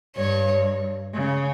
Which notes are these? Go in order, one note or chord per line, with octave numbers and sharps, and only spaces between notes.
G2 C#5
C#3